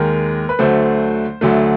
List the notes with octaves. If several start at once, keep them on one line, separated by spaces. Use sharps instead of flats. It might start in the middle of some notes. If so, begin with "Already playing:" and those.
Already playing: D#2 D#3 G#3 A#4
B4
D2 D3 F#3 A3 C5
D2 D3 F#3 A3